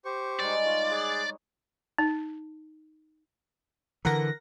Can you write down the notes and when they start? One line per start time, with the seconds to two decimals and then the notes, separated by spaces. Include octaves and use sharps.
0.05 G4 C5 C#6
0.40 G3 G#3 D#4 D5
0.66 F4 C#5 D#5
0.90 G#4 D6 F#6
1.98 D#4
4.05 D3 E3 A#4 F#5 A#6